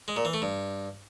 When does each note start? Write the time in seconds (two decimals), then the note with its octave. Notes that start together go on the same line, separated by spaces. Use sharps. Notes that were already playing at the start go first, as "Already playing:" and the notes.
0.08 G#3
0.16 A#2
0.25 E3
0.34 A3
0.42 G2